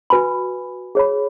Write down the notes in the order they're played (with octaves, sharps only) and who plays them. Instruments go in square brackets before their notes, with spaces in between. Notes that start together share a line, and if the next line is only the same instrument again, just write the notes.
[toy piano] F#4 B4 G#5 B5
G#4 C#5 B5